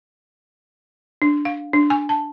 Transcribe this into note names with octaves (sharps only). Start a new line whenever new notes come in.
D4
F5
D4
G#5
A5